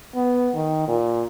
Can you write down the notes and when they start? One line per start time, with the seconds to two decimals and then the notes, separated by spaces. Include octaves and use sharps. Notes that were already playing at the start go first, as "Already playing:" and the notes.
0.15 B3
0.54 D#3
0.88 A#2